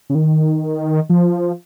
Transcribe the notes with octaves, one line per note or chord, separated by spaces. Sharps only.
C#3
D#3
F3